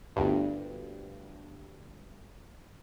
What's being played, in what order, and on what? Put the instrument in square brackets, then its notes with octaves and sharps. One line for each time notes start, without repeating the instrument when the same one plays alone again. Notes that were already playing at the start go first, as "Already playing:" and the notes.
[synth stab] G1 D2 G2